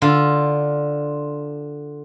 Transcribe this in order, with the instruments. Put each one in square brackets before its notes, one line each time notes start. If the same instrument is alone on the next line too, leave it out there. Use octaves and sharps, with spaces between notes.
[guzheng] D3 F4